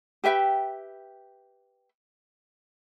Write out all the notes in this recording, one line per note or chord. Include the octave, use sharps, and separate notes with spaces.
G4 B4 E5 G5